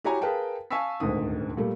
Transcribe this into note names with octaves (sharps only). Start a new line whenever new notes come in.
E4 F#4 G4 C#5 G#5 A#5
G#4 A#4 B4 F5 G5 A5
F5 G#5 A5 C#6 E6 B6
D#1 D2 G#2 D#3 D#6
A#2 G3 A3